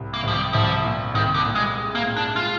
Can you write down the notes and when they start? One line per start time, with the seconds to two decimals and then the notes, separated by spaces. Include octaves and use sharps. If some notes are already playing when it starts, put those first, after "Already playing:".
Already playing: C2
0.14 A#3
0.23 C2 F3
0.33 G3
0.53 C2 F3
0.84 A#2
1.14 C2 D#3
1.34 D3
1.45 A#2
1.55 G#3
1.76 G#3
1.95 A#3
2.06 A#2
2.17 D4
2.36 G#3 F4